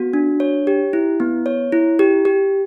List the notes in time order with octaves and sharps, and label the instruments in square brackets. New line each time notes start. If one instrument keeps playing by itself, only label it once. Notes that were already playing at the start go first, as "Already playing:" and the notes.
Already playing: [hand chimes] B3 F#4
D4
C#5
G4
E4
B3
C#5
E4
G4
G4